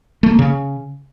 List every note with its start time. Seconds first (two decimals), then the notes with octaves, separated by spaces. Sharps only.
0.23 A3
0.31 A#3
0.39 C#3